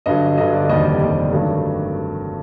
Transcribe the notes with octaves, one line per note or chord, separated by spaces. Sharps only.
G2 D3 F#3 D#5
G2 D3 F#3 D#5
D5
F1 D#2 D3 G3 D#5
D#5
F1 D#2 D3 G3 D5
G2 D#3 F#3 A3